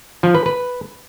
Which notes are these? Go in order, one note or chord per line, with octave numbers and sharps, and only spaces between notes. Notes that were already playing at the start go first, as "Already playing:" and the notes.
F3
B4
B4